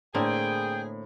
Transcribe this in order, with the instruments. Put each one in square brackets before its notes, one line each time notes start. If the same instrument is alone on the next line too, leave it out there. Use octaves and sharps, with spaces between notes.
[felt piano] A2 [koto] D3 A#3 C4 [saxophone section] G#4 [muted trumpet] G5